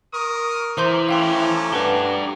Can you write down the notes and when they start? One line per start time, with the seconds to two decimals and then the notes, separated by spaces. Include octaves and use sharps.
0.13 A#4 C#6 D#6
0.78 E3 C5 A#5 C6 D6 G6
1.09 A3 C#4 F5 G5 C6
1.73 D4 G4 B4 F#5 A5